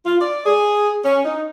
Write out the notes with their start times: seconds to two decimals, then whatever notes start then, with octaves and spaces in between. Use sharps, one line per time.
0.06 F4
0.21 D5
0.46 G#4
1.04 C#4
1.25 D#4